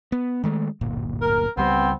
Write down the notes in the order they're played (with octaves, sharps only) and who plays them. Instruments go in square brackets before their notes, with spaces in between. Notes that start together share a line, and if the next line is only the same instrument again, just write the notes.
[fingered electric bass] B3
D#3 G#3 A3
D1 G1 A#2
[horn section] A#4
[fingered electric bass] C#2 G3 [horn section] B3 C4